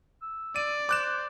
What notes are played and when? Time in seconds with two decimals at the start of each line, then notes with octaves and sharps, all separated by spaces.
0.22 E6
0.56 D5 D#7
0.89 C5 D6 F#6 E7